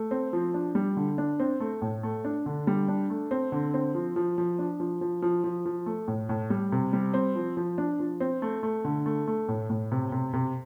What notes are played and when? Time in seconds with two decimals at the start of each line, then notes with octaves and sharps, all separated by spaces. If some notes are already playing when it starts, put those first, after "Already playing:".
Already playing: A3
0.11 C4
0.33 F3
0.54 D4
0.75 G3
0.96 D3
1.18 D4
1.40 C4
1.60 A3
1.82 A2
2.03 A3
2.25 D4
2.46 D3
2.67 G3
2.88 D4
3.10 A3
3.31 C4
3.52 D3
3.74 C4
3.95 F3
4.16 F3
4.38 F3
4.59 D4
4.80 F3
5.01 F3
5.22 F3
5.44 F3
5.66 F3
5.86 A3
6.08 A2
6.29 A2
6.50 G3
6.72 C3
6.93 G3
7.14 C4
7.36 F3
7.57 F3
7.78 D4
7.99 F3
8.20 C4
8.42 A3
8.63 A3
8.85 D3
9.06 A3
9.28 A3
9.48 A2
9.70 A2
9.92 C3
10.12 C3
10.33 C3